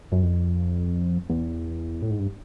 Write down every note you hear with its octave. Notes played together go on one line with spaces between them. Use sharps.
F#2
F2
E2
A2
G#2
G2